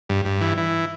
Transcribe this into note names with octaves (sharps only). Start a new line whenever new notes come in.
G2
G2
E3
E3